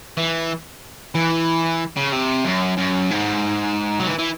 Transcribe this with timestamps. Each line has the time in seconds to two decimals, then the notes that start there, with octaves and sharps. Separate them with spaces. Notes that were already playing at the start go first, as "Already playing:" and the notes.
0.17 E3
1.15 E3
1.96 C#3
2.12 C3
2.45 F#2
2.78 F#2
3.11 G#2
4.00 F#3
4.08 E3
4.19 E3